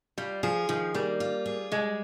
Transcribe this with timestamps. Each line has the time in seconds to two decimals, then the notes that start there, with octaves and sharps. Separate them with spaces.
0.18 G3 F4
0.43 F3 G#4
0.69 D#3 F3
0.94 G3 A#3
1.20 F4
1.46 G#4
1.72 G3 G#3